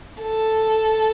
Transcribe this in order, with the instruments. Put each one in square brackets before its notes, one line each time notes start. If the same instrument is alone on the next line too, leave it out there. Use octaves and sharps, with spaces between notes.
[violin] A4